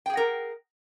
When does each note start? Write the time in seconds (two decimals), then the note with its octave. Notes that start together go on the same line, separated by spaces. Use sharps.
0.06 G5
0.10 G#4
0.13 F#5
0.17 A#4